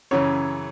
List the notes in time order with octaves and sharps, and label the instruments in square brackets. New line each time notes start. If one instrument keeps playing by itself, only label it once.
[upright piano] F#2 C#3 E3 C#5